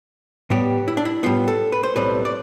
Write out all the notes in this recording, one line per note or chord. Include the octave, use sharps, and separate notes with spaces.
A2 G3 B3 G4
E4
D4
E4
A2 G3 B3 F4
A4
B4
C5
B1 A2 G3 C4 B4
D5